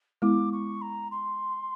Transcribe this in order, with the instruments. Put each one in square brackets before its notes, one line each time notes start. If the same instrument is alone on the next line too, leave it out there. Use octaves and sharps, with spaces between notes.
[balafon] G#3 B3 E4 [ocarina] D6
[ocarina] C#6
A#5
C6